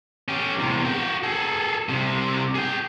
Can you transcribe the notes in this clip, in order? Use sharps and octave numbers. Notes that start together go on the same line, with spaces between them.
C#4 G4
E2 C3
F#4 G5
G#4 A4
C2 C3
G#4 G5